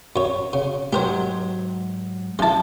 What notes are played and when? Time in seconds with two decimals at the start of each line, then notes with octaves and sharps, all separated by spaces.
0.16 F#2 C#5
0.53 C#3
0.93 G#2 F#3 G4 A#4 C5
2.39 F#2 G#3 E4 A5